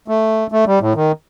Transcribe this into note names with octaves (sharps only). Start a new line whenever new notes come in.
A3
A3
G3
A2
D#3